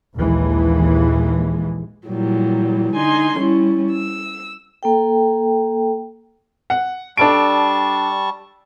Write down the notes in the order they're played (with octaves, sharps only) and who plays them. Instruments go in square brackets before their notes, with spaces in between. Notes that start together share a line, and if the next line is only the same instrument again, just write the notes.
[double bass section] A#1 D#2 E3 G#3
[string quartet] A#2 E3 F#3 G3
D3 D#4 G#5 C6
G3 C#4 E4
E6
[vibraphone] A#3 A4 G5
[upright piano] F#5
[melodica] G3 A5 C#6 [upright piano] D4 A4 D7